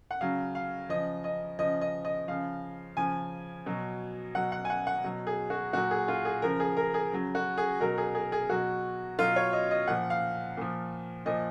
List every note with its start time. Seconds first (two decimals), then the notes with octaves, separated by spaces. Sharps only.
0.11 F#5
0.21 C#3 F#3 F5
0.55 F5
0.89 C#3 F3 D#5
1.24 D#5
1.59 C#3 F3 D#5
1.81 D#5
2.05 D#5
2.28 C#3 F3 F5
2.97 C#3 F3 G#5
3.66 B2 F#3
4.35 B2 F#3 F#5
4.52 F#5
4.65 G#5
4.70 F#5
4.87 F#5
5.04 B2 F#3
5.27 G#4
5.50 F#4
5.73 A#2 F#3 F#4
5.91 G#4
6.08 F4
6.25 G#4
6.42 C#3 F3 A#4
6.60 G#4
6.77 A#4
6.94 G#4
7.12 C#3 F#3
7.35 F#4
7.58 G#4
7.80 B2 F#3 A#4
7.98 G#4
8.15 G#4
8.32 G#4
8.49 B2 F#3 F#4
9.19 B2 F#3 F4
9.36 C#5
9.53 D#5
9.71 D#5
9.88 A#2 F3 F#5
10.10 F5
10.57 A#2 F3
11.26 A#2 F3 D#5